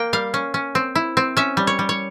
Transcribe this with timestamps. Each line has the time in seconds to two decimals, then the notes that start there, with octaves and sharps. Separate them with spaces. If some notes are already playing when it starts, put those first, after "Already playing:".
Already playing: A#3 G5
0.13 G3 F5
0.34 C#4
0.54 C#4
0.75 C4
0.95 E4
1.17 C4
1.37 C#4 E5
1.57 G3
1.67 C#5
1.79 G3
1.89 C#5